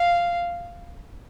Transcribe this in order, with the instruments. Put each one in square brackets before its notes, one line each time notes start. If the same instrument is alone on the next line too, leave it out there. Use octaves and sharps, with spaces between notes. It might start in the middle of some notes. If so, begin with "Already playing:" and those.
Already playing: [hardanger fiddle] F5